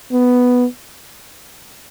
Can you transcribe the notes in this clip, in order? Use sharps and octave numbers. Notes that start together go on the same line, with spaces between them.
B3